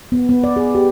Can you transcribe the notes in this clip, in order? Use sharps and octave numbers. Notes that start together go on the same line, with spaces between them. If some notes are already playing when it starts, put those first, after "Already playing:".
B3
B3
D5
G#4
G4